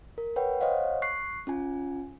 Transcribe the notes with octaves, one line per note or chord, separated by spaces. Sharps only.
A#4
B4 C#5 F#5 G5
C5 C#5 D#5 F5 F#5
C#6 F#6 C7
C#4 F4 G#5